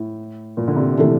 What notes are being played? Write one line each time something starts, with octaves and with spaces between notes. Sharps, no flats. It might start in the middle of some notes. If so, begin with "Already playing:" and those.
Already playing: A2
A#2
D3
C3
C3 E3 A3